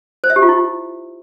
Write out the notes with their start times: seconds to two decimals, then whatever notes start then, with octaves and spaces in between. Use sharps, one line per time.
0.24 C5
0.30 E5
0.36 G4
0.42 F4
0.49 E4